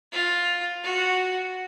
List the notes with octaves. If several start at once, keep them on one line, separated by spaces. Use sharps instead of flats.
F4
F#4